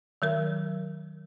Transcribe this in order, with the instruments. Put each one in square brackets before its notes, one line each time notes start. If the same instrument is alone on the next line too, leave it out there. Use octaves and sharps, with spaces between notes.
[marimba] D#3 F#3 A#4